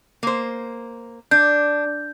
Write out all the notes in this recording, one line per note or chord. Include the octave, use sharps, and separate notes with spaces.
A#3 C5
D4 G6